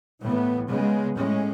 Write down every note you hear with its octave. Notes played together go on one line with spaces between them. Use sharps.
A2 E3 B3
C#3 G#3 B3
A2 G#3 C#4